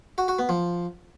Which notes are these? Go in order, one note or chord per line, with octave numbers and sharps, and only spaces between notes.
F#4
F#4
B3
F3